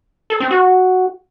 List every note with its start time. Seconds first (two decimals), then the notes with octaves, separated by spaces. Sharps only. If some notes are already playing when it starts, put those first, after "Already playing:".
0.30 A4
0.40 C4
0.51 F#4